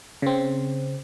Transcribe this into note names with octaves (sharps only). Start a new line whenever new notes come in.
C#3 C4